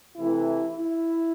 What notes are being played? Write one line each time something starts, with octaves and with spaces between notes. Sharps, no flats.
C3 E3 A3 E4
E4